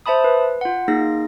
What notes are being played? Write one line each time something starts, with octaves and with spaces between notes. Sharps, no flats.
C5 E5 A5 B5 D#6
B4
F4 F#5
A#3 D#4 G#4 F5 A#6